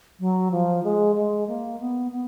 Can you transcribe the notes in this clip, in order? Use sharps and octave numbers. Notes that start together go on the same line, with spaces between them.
F#3
F3
G#3
G#3
A#3
B3
B3